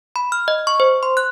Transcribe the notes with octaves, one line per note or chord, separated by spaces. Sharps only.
B5
F6
D#5
C#6
C5
C6
F#6